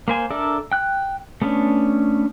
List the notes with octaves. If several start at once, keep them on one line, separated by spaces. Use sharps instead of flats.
A#3 C5 G#5
D4 A4 A#4 D5 E5
G5 F#6
A3 B3 C#4 D4